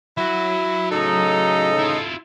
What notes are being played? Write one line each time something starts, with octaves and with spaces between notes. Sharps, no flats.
F#3 E4 F#4
A2 C#3 D#4 A4
E4 F4